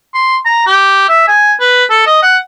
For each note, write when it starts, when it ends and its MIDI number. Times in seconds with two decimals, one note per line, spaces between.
0.14 0.37 84
0.46 0.64 82
0.66 1.06 67
1.09 1.26 76
1.28 1.53 80
1.60 1.84 71
1.90 2.03 69
2.06 2.19 75
2.22 2.37 78